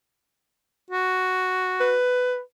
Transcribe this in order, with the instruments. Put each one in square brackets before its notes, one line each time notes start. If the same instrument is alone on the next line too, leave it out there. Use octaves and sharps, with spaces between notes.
[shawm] F#4
[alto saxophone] B4